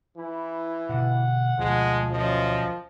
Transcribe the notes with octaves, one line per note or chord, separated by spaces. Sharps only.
E3 E4
B2 D3 F#5
D2 B2 F3 G#3
F#2 F3 D#5